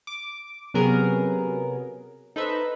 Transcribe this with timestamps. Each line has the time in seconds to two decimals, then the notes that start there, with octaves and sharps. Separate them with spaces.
0.07 D6
0.74 C3 F#3 B3 C#4 G#4 A#4
2.36 D#4 A4 B4 C5 E5